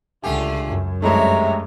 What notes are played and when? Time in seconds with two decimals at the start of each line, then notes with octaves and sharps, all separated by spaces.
0.24 C#2 D3 A3 F4 G4 G#5
0.67 F#2
1.02 E2 G2 C3 G#3 A3 E4 C#5 A#5